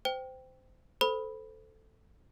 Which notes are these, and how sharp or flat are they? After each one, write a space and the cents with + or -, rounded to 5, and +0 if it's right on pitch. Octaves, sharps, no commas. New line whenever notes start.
C5 -20 G5 +0
A4 +0 C5 -15 B5 +0